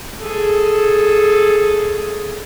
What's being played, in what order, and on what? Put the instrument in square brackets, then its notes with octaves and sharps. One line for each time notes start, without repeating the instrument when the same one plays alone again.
[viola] G#4 A4